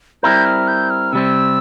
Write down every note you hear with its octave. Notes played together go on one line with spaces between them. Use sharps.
G3 C4 E4 A#4 G6
F6
G6
F6
C3 G3 C4 E6